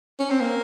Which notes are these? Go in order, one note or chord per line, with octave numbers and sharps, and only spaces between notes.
C#4
C4
A#3